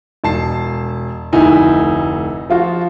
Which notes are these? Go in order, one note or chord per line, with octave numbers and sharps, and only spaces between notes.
E1 A5 C7
F1 D2 D#4 E4 G#5
F3 F4 F#4